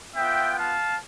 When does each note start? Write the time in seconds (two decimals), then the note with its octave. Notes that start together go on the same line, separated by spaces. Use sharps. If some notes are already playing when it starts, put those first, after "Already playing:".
0.15 B3 F4 E5 G5
0.57 F5 A5